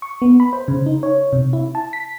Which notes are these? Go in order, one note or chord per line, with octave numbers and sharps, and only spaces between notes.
C#6
B3
B5
C5
C#3
D#4
C#5
C3
E4
A5
B6